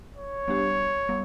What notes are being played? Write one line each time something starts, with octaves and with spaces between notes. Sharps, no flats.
C#5
G3 B3 D4 G4
G3 B3